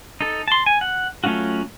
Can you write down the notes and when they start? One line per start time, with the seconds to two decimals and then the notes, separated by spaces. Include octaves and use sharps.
0.21 D#4 A4
0.48 A5 C6
0.66 G#5
0.81 F#5
1.24 F#3 A3 C#4 F4 F#4